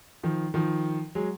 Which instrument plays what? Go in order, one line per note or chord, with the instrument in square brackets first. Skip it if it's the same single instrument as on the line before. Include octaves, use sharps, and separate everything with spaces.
[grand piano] D#3 F3
D#3 F3
F#3 G#3